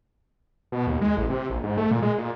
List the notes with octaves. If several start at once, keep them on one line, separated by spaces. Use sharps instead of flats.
B2
D#2
G#3
A1
C3
A#1
G#2
A3
A#2
G#3
A#2